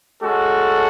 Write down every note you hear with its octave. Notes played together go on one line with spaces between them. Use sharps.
G#3 C#4 F#4 A4